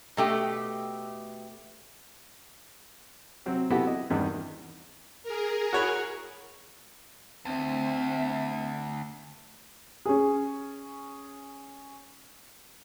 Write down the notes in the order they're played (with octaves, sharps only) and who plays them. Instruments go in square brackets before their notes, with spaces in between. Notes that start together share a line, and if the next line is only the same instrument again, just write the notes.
[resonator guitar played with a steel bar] B2 A3 G4
[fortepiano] C3 F#3 C4
B3 E4 F#4 G4 A4 B4
D#5
E2 G2 D#3 B3
[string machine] G#4 A#4
[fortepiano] F#4 C#5 B5
[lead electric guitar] D2 [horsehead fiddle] C4 E5
[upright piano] C#4 G#4